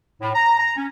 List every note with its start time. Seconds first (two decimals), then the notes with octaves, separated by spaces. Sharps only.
0.22 A2
0.35 A#5
0.59 A#5
0.77 C#4